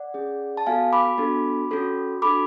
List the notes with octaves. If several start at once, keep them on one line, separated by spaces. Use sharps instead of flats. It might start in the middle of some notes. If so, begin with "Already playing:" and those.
Already playing: D5 F#5
C#4 G#4
A5
B3 F#4 A4 F5 G#5
B5 D6
B3 D4 F#4 A4
C#4 F#4 A4
D4 F#4 A4 B5 D6